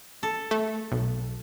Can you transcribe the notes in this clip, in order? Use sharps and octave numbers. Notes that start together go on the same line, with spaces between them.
A4
A3
B1